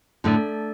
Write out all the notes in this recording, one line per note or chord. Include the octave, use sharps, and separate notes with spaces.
A2 D3 A3 D4 A4 D5